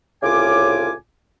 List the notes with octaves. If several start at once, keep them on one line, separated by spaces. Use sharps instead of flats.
C2 A2 C#3 F4 G#5 D6